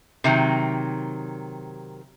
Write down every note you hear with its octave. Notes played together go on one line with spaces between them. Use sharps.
C3 D#3 F#3